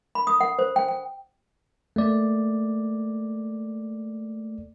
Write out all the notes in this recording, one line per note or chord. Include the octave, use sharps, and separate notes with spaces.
B5
D#6
F#5
C5
G5
G5
A3 A#3 D5